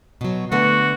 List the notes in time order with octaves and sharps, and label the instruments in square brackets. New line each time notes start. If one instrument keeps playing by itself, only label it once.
[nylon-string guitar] B2 F#3
[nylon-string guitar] D3 A3 B3 [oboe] F#4